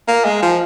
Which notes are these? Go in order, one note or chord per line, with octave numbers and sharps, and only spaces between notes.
A#3
G#3
F3